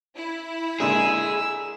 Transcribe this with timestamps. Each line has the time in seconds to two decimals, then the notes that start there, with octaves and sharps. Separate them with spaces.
0.16 E4
0.80 A#2 D3 G#3 G#4 E6